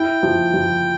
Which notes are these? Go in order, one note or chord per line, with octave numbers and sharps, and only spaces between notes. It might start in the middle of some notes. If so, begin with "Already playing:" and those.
Already playing: E4 G5
F3
F3